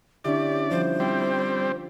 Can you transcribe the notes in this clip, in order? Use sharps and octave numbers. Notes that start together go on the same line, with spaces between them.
D3 C#4 D4 E4 G4 D5 E5
F3 G3 C5
G3 C4 G5